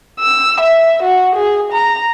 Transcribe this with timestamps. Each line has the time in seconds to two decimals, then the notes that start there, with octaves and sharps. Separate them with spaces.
0.20 E6
0.61 E5
1.03 F#4
1.36 G#4
1.72 A#5